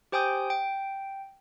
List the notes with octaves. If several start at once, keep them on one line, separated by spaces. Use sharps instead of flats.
G4 C5 G5 G#5 D#6 G6
G5